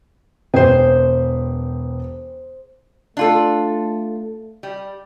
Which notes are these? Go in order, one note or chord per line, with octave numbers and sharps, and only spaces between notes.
E1 G#4 B4 C5 G5
A3 D4 F4 A4
G3